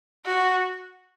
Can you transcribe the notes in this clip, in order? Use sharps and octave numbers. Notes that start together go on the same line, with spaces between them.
F#4